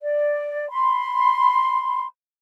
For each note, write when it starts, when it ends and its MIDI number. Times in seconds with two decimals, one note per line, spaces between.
0.01 0.68 74
0.70 2.05 83
0.70 2.05 84